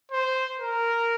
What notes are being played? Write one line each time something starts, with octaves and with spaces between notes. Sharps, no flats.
C5
A#4